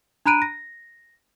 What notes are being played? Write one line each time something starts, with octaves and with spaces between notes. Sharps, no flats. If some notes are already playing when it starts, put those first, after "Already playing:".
D4 A#5 B5 F#6 D7 D#7
A#6